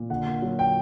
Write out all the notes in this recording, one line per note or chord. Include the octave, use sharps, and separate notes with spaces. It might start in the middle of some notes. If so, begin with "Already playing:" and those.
Already playing: A#2
D3 F#5
A#3
F#3
G5